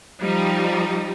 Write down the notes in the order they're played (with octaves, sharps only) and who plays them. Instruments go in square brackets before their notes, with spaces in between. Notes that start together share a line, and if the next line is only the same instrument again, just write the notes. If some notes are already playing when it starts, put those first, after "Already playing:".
[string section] F3 G3 D#4